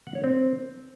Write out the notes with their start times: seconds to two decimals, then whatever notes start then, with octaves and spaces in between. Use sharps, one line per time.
0.07 F#5
0.15 C#5
0.24 C4